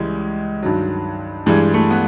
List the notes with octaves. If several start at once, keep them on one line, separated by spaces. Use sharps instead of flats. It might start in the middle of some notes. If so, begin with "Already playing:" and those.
Already playing: C#2 C#3 E3 G3 G#3
G2 D#3 F#3
G2 E3 G3 G#3
A3
B3